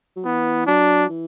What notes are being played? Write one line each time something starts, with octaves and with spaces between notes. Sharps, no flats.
F#3
E3 B3
F#3 D4
E3